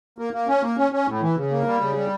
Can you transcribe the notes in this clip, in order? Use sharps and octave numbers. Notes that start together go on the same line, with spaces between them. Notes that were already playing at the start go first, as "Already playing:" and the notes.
A#3
A#3
C#4
A#3
C#4
C#4
A2
E3
C#3
A#3
G3
C#3
G3